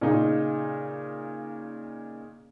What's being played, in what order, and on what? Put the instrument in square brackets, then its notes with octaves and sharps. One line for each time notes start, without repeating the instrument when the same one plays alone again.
[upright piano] A#2 C#3 D#4